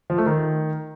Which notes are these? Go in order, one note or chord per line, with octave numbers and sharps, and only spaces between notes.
F3
A3
D#3